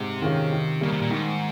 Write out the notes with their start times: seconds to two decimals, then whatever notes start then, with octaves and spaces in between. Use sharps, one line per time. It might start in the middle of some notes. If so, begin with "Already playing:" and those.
Already playing: G#2 C3
0.22 D#3 G#3 C#4 F4
0.52 D#3
0.81 C#3 G3 A#3
0.92 C3
1.01 A#2
1.10 G#2 D#3